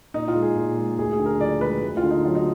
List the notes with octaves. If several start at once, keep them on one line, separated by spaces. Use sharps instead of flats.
A#2 D#4
F4
G#3
G#4
A#2
G#3
D2 G#4
G#4
D3
A#4
F3 D5
G#3 B4
D2
F4
D3
D#4
F#3 F4
D#4